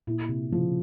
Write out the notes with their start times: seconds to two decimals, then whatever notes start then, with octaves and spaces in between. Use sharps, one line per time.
0.07 A#2 E4
0.29 C3
0.52 C#3 F3